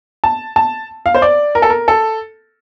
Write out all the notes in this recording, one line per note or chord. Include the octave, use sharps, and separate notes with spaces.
A5
A5
F5
C5
D5
A#4
A4
A#4
A4